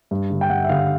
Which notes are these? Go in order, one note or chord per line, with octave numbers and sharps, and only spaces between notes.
G2
D3 G3
G5
G2 F#5
E5
D3 G3 F5